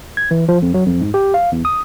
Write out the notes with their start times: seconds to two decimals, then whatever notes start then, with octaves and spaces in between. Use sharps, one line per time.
0.17 G#6
0.31 E3
0.49 F3
0.62 F2
0.74 F#3
0.86 F2
1.01 G#2
1.14 G4
1.34 F5
1.52 E2
1.65 D#6